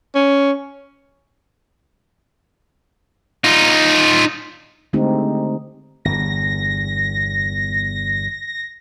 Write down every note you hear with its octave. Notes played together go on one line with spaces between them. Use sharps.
C#4
D#4 F4
D3 G#3 A3 C4 D#4 G4
G1 E2 A#6